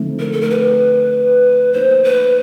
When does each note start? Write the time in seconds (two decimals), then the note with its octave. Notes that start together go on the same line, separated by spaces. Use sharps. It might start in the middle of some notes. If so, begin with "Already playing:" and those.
Already playing: D3 F3 A3 C4 D#4
0.20 A#4
0.32 A4
0.41 A#4
0.50 B4
1.73 F3 A#3 D#4 C5
2.04 B4